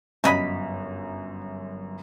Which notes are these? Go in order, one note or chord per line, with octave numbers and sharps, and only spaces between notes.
G1 F#2 A3 D#5 B5